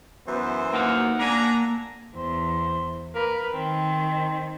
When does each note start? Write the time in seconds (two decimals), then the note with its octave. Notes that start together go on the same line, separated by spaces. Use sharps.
0.27 F#2 E3 B3 C5
0.73 A#3 D#4 F5 F#5
1.19 A#3 D4 G#5 A#5
2.16 E2 C5
3.15 A#4 B4
3.53 D#3 C4